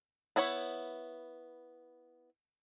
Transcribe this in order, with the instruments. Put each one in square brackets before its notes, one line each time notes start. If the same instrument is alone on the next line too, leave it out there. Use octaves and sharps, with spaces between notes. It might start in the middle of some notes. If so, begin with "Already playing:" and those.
[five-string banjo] B3 E4 C#5